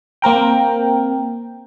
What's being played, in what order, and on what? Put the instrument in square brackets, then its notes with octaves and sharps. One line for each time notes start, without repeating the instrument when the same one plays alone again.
[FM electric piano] A#3 C4 A#4 G5